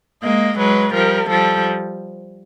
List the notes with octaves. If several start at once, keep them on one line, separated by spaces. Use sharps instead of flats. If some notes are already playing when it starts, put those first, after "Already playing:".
G#3 A#3 D#5
F#3 G#3 B4
F3 G3 A#4
F3 G3 A4